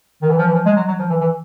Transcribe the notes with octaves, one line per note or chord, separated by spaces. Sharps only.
D#3
E3
F3
E3
F3
G#3
F#3
F#3
F3
E3
E3